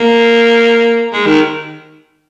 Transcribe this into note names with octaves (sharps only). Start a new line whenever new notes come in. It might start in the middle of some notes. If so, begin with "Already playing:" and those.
Already playing: A#3
G#3
D#3